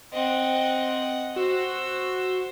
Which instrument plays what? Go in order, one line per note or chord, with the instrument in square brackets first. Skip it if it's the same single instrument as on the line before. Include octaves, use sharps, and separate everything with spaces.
[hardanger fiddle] C4 [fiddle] D#5 F#5
[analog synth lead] F#4 [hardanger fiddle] C5 [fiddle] E6